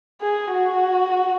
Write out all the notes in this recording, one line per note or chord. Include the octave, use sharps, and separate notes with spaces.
G#4
F#4